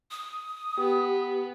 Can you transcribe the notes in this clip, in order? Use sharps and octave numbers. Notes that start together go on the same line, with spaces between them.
D#6
B3 G4